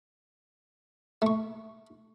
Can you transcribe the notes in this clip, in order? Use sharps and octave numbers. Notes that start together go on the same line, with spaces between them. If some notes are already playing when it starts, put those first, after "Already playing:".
A3 C#6